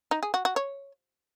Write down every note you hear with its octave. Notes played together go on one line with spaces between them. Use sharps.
D#4
G#4
F#4
F#4
C#5